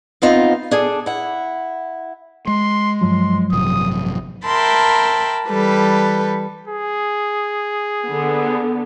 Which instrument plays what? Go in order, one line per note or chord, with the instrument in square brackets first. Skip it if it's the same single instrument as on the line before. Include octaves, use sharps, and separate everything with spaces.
[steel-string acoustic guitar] B3 C4 D#4 F4
D4 G#4 A4
E4 F#5
[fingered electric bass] G#3 [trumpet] C6
[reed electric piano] G2 F3 F#3 [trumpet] C6
[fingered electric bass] A1 C3 [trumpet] D#6
[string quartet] A#4 E5 G5 A5 B5 C6
E3 G3 A4 B4
[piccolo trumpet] G#4
[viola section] D3 B3